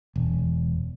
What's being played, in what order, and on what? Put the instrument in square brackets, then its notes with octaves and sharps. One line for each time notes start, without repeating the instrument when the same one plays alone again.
[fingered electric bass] E1